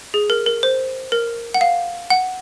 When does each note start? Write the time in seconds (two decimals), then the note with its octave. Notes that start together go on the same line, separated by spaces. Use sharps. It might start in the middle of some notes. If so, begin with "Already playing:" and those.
0.14 G#4
0.30 A#4
0.46 A#4
0.63 C5
1.12 A#4
1.54 F#5
1.61 F5
2.10 F#5